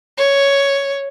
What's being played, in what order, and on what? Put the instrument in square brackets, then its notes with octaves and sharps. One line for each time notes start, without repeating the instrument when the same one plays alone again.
[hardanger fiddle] C#5